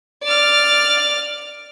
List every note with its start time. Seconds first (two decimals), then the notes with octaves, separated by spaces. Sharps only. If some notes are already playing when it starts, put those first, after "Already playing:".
0.23 D5 F6